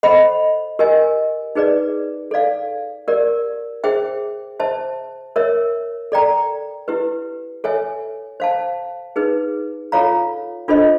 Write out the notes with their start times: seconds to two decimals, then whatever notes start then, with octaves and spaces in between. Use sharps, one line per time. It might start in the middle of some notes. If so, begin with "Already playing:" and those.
0.03 A4 C5 D#5 F#5 B5
0.79 G4 A#4 D#5 G#5
1.55 D#4 G#4 B4 D5
2.31 A4 D5 F5
3.08 G4 A#4 D5
3.84 G#4 C5 E5 G5
4.60 C5 E5 A5
5.36 A#4 C#5 E5
6.12 A4 D5 G5 A#5
6.88 E4 G4 B4
7.64 A4 C#5 E5 G#5
8.40 C5 F5 A5
9.16 D#4 G#4 B4
9.92 F4 A4 C#5 F5 A#5
10.68 D4 F4 A4 C5 D#5